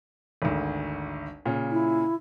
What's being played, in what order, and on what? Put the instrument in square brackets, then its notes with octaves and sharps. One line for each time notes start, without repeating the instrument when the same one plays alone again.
[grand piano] G#1 D2
A#2 C#3
[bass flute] E4